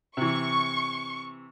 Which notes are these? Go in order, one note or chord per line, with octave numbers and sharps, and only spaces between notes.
C3 E3 C#6